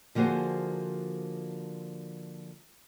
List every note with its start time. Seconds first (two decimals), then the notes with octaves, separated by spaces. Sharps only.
0.15 D3 F3 A#3 F#4 G#4 C5